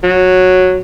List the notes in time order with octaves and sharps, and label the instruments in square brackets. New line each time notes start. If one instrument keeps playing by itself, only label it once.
[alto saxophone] F#3